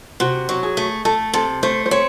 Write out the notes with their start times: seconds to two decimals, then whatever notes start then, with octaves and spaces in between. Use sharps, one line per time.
0.20 C3 F#4
0.49 F#3
0.63 G#4
0.77 A3
1.05 A3 A4
1.34 C3 A4
1.63 A3 C5
1.86 C5
1.91 C4 C#5